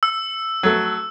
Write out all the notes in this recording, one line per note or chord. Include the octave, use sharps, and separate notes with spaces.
E6
F#3 A3